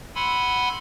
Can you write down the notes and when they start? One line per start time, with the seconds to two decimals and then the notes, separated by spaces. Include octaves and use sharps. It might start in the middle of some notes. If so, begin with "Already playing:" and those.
0.15 F#5 G#5 B5 C6 E6